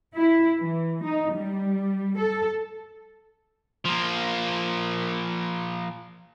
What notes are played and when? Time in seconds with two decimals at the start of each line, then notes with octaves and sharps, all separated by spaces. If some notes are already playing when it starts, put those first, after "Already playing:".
0.14 E4
0.61 E3
1.05 D#4
1.34 G3
2.18 A4
3.85 F3 A#3